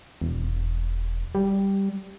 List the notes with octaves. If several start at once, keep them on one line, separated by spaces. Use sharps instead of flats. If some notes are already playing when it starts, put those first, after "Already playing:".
E1
G3